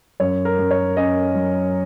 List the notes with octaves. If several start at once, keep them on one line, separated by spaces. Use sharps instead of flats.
F#2 C#5
A#4
F#2
C#5
C#4 D#5
F#3